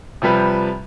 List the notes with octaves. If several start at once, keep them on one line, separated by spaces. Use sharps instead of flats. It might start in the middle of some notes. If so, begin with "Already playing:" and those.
C3 F3 G3 B4